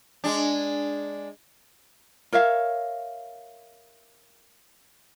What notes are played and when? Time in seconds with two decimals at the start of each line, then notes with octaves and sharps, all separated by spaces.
0.24 G#3 D4
2.33 A#4 C#5 E5 F5